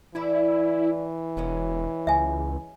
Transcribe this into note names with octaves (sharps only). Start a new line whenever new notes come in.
D3 E3 A3 E4 D5
E1 F#3 G#3 C#4
C#2 E5 G#5